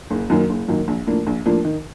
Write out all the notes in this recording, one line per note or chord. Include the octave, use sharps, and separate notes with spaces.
F#1
F#2 D#3 F#3 A#3
F#1
F#2 D#3 F#3 A#3
A#1
A2 F3 A#3 D4
A#1
A2 F3 A#3 D4
D#3